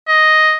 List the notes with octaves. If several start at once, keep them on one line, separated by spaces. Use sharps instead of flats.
D#5